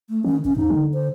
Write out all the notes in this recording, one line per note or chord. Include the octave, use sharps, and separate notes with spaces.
A3
D#3 C#4
F#1 C#4
E2 D#4
D3
C5